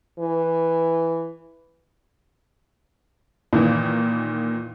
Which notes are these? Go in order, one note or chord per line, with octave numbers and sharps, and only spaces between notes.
E3
A#2 D#3 E3